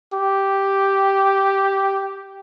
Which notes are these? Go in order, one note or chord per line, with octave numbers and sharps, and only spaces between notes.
G4